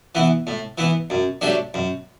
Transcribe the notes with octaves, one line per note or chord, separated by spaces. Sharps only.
E3 B3 E4
A2
E3 B3 E4
F#2
F#3 A3 D4 G4
F#2